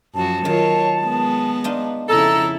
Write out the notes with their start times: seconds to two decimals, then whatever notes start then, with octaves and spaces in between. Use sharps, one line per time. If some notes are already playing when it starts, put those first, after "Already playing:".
0.15 F#2 F3 F#4 A5
0.45 D#3 F#3 F4 C#5
1.04 G#3 B3
1.64 D4 D#4 F4
2.09 F2 C#3 E4 A4 A#5